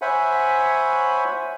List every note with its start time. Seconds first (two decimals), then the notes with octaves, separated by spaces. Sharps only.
0.02 C5 C#5 E5 F#5 G#5 B5